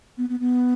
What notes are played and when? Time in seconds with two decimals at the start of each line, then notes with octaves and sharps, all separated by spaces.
0.18 B3
0.29 B3
0.40 B3